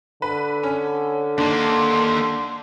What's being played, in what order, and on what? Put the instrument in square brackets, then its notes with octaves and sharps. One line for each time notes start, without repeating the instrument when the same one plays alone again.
[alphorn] D3 [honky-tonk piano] B4
[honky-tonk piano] C#4 [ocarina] C#5
[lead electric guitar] D#2 A#3 [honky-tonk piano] D4 [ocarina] C6